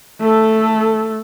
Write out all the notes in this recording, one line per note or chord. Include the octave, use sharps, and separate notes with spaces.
A3 A4